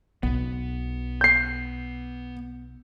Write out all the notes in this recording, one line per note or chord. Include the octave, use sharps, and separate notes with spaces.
B1 B3
G6 C7